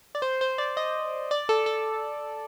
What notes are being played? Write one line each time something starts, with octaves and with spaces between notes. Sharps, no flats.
D5
C5
C5
D5
D#5
D5
A4
A4